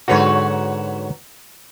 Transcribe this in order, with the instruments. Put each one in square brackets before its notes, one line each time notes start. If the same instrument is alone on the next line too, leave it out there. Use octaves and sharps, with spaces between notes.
[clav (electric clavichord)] G#2 D3 F#4 [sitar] F#3 B4 C#5